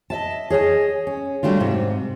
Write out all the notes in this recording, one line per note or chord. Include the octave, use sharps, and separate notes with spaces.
D#5 E5 A5
G#4 C#5 D#5 G#5
C#4
F#3 G3 A3 D4 F4
G#2 C3